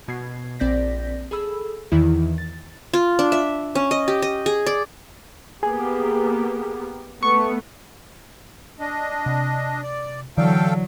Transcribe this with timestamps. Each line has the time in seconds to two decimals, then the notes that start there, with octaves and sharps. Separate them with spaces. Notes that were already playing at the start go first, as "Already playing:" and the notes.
0.08 B2 G#6 C7
0.59 A#1 C4 D5 G6 A#6 B6
1.31 G#4 A4 B5 E6
1.92 E2 D#3 E3 E4
2.38 A6
2.93 F4
3.19 D4
3.32 E5
3.75 C#4
3.91 D#5
4.08 G4
4.22 D#5
4.46 G#4
4.66 D5
5.63 A#3 B3 G4 G#4
7.23 A3 B3 C#6
8.80 D4 D#5
9.26 C3
9.83 D5
10.37 D3 E3 F#3 A4 D5 F5 G5